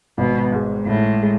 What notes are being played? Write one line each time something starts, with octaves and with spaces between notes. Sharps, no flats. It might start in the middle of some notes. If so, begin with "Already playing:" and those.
G#1 B2
G#2 G#3
G#1 A2
G#3